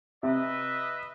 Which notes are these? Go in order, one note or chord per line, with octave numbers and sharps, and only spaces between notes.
C3 B4 D#5 E5